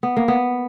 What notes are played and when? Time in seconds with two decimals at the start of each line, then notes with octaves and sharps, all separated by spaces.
0.03 B3
0.17 A#3
0.28 B3